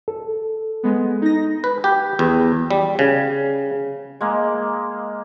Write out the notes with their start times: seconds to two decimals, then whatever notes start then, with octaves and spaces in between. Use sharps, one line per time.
0.08 A4
0.83 G#3 B3
1.22 D#4 A#6
1.64 B4
1.84 G4
2.19 E2
2.71 G3
2.99 C#3
4.21 G#3 A#3